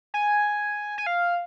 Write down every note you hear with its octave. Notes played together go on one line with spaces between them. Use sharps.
G#5
G#5
F5